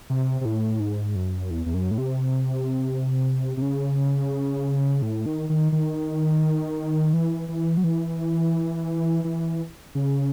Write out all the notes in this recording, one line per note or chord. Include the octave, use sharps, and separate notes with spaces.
C3
C3
A2
G#2
F#2
E2
E2
F#2
A2
C3
C3
C#3
A2
D#3
D#3
D#3
E3
E3
F#3
E3
E3
C#3